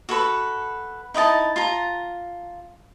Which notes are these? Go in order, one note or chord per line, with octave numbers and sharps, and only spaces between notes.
F#4 A4 B4 B5
D#4 E4 D#5 A5
F4 A5 A#5